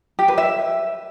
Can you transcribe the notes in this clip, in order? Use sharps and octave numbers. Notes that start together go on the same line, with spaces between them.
G4
B4
E5